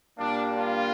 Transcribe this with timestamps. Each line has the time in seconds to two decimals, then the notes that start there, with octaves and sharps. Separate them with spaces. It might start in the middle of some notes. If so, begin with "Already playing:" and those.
0.18 A#2 G3 A#3 D4
0.55 D4 F4